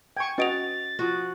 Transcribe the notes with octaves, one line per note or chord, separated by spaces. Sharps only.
G5 G#5 C#6 G#6
C#4 F#4 B4 D#5 A6 D7 F7
F3 F#4